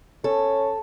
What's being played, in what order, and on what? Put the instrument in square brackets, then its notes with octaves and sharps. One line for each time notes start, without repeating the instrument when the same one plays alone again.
[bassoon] C#4 [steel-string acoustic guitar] A4